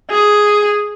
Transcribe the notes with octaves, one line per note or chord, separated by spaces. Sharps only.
G#4